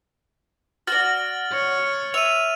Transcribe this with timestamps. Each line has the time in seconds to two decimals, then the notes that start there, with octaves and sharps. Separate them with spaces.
0.87 F#4 D5 F6 A6 F#7
1.52 C#5
2.14 E5 D#7 F7